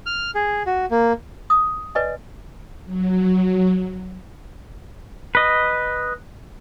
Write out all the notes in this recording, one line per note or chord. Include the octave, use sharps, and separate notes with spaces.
F6
G#4
F#4
A#3
D#6
B4 D5 D#5 G#5
F#3
B4 D#5